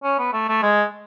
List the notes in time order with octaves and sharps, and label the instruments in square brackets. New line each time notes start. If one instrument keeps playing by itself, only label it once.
[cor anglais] C#4
B3
A3
A3
G#3